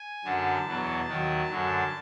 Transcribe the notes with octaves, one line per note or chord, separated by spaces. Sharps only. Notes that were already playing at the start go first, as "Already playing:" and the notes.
Already playing: G#5
F#2 D3 F#3 A5
E2 B2 F#3
D#2 D#3 F#3
F#2 D3 F#3